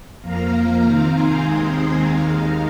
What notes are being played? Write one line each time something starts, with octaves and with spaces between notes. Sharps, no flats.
F2 F3 A#3 F5 A#5
C3 D#3 C4
G#5 C6
D#2 D#3 G#3 C4 A#5 D#6
G#5 C6
D#2 D#3 G#3 F5 A#5